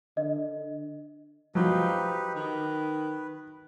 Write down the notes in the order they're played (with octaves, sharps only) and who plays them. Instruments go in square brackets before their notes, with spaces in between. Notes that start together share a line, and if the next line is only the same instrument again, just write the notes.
[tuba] D3 [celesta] D#5
[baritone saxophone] F3 [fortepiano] F#3 [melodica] D#4 G4 B4
[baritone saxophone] D#3 [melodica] B4